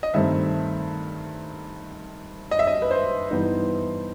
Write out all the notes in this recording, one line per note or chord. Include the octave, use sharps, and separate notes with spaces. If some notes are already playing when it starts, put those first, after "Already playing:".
D#5
G2 D#3 A3 C4 E5
D#5
E5
D#5
B4
C5
G2 E3 B3 D#4